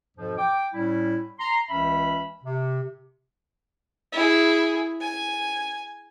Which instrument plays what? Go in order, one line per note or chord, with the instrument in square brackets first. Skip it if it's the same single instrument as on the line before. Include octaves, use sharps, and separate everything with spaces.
[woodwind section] F2 G#2 B2 F3
G5 D6
A2 G3 C#4 E4
A#5 C6
C#2 E3 C#4 E5 B5
C3
[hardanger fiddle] E4 G#4
G#5